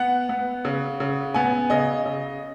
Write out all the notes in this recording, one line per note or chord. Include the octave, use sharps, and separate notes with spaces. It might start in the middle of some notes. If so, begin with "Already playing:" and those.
Already playing: B3 F#5
B3
C#3
C#3
B3 G#5
C#3 D#5
C#3